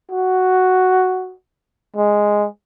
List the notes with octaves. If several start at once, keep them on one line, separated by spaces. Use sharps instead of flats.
F#4
G#3